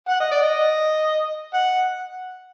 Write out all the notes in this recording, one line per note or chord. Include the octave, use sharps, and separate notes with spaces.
F#5
D#5
D5
D#5
F#5